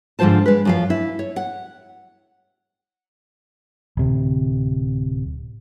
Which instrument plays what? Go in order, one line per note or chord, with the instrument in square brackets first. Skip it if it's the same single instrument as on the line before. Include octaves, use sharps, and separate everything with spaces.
[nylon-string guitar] G#2 D3 F3 F4 C5 A5
G#3 B4
F#2 F3 F5
E4
C#5
F#5
[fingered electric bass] D1 C3